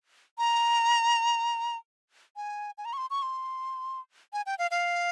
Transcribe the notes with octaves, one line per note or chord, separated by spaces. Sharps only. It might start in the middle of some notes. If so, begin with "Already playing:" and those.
A#5
G#5
G#5
A#5
C#6
C6
C#6
C6
G#5
G5
F5
F5